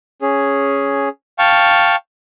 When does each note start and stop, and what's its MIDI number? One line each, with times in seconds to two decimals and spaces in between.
0.22 1.09 61
0.22 1.09 68
1.39 1.96 77
1.39 1.96 79
1.39 1.96 81
1.39 1.96 85